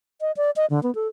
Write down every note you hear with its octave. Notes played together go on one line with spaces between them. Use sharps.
D#5
D5
D#5
D3
B3
A4